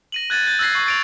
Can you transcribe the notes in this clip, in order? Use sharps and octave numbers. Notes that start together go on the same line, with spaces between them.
A#6 D#7 F#7
F#6 G#6 A6 D#7
G6 A6
E6 F#6 G#6 A#6 C7
C#6 A#6 C7
A6 D7 F7